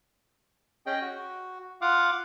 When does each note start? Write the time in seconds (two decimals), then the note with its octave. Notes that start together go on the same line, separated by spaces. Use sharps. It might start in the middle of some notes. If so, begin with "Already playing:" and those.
0.86 C#4 G#4 D#5 G5
1.02 F#4
1.81 F4 F5 F#5 D6